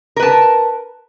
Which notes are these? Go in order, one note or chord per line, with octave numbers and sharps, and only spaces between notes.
A#4 B4 A5